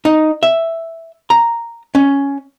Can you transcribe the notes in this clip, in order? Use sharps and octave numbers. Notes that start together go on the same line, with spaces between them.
D#4
E5
A#5
C#4